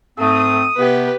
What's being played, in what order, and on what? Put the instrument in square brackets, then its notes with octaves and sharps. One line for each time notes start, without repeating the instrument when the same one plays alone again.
[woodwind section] G#2 C4 [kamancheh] A3 [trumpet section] D#6
[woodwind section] C3 B3 [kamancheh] G4 B4